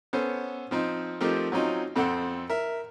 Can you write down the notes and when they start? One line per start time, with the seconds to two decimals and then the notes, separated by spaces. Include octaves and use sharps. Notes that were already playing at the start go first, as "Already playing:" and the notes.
0.13 B3 C#4 A4 C5
0.71 F3 C4 D#4
1.21 F3 A3 C4 D#4 G4 A#4
1.52 F#3 C4 C#4 D#4 F4
1.96 F2 C4 A4 F#5 C6
2.50 A#4 E5